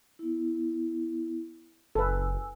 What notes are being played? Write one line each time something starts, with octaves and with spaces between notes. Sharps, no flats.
B3 E4
F#1 A4 B4 G#5 E6